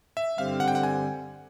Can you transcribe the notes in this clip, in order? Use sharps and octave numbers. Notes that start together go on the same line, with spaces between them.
E5
G2 D3 G3 C4 F5
F#5
G5
F#5
G#5